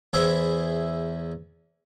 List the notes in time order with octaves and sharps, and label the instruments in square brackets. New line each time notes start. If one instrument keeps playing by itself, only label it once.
[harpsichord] E2 E4 G#4 C5 E5